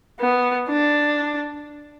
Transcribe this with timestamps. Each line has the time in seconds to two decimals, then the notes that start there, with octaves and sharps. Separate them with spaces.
0.20 B3
0.69 D4